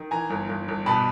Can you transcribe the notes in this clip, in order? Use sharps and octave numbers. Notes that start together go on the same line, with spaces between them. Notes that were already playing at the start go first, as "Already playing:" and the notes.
Already playing: D#3
E3 G#5 A#5
G1
G1
G1
B2 A5 B5